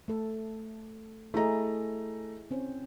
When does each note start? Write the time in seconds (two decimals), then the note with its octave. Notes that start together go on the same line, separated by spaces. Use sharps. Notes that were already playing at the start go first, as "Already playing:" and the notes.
0.08 A3 A4
1.34 A3 E4 G#4 D#5 A#5
2.51 C4 C#4 C5